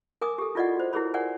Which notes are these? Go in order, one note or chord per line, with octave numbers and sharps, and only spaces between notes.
A#4 G#5 D6 D#6
G4 A4
E4 F4 D5 D#5 F#5
F#4 C5
E4 F#4 G#4 A#4 C#5 B5
A#4 C#5 D5 F#5 G#5